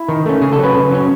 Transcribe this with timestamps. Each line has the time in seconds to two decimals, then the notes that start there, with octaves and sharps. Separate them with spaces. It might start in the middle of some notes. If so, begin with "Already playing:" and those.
Already playing: E4
0.08 D#3
0.26 A3 C#4
0.41 C#3 G#4
0.52 A4
0.59 F#3 C#4 B4
0.75 C#3
0.91 F#3 C#4